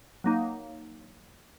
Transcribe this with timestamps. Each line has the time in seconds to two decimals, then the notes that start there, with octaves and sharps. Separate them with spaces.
0.24 F#3 A#3 D#4